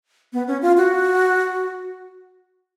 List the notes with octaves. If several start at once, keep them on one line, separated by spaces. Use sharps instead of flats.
B3
C#4
F4
F#4